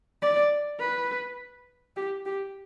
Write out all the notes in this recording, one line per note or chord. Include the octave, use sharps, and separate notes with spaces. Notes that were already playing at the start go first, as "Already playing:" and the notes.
D5
B4
G4
G4